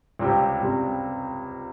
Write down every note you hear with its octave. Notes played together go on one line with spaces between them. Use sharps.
C#2 C3 G3 C4 G4
C#2 C3 G3 C4 G4